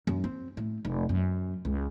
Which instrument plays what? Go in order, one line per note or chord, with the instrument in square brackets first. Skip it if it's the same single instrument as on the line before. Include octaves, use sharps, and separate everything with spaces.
[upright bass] F#2
C4
A2
F1
F#2
C#2